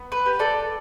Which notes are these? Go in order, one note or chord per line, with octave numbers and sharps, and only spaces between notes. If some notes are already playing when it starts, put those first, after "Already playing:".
Already playing: B3
B4
G4
A4 D5